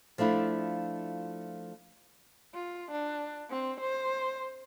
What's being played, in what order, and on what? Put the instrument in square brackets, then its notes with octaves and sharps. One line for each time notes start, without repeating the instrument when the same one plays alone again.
[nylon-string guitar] F3 A3 D4 E4 F4
[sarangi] F4
D4
C4
C5